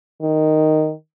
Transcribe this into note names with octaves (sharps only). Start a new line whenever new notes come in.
D#3